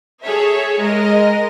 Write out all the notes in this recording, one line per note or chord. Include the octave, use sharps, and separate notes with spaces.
G#4 A4 C#5 E5
G#3 A#4 D#5